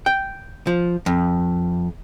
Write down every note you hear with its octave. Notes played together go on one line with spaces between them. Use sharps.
G5
F3
F2